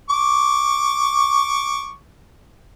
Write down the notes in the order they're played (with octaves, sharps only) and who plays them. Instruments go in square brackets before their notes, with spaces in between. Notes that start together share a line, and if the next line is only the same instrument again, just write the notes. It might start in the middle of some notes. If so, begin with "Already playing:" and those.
[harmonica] C#6 D6